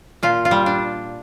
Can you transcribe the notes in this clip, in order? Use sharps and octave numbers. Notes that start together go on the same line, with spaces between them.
A#2 F4
F4
G3
D4